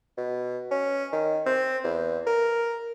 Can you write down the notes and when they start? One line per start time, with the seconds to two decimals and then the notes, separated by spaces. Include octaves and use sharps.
0.17 B2
0.71 C#4
1.12 D#3
1.46 C4
1.84 E2
2.27 A#4